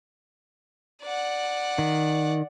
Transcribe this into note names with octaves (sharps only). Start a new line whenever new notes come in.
D5 F#5
D#3